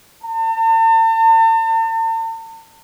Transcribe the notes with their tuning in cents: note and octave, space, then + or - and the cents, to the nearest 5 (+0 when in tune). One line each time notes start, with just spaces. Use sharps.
A5 +45